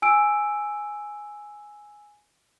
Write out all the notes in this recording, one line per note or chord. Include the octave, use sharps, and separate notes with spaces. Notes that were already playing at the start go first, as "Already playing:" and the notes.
G#5 E6 D7